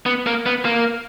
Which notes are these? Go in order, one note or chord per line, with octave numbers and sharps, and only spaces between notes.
B3
A#3
B3
A#3